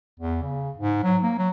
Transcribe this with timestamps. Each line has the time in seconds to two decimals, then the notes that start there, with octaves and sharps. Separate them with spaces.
0.20 E2
0.43 C#3
0.78 G#2
1.04 F#3
1.23 A#3
1.38 F#3